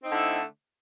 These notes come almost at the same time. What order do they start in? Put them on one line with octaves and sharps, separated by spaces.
C4 D#4 D3 E4 A3